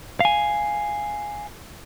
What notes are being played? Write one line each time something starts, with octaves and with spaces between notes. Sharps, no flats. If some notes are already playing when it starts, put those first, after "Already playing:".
F5 G#5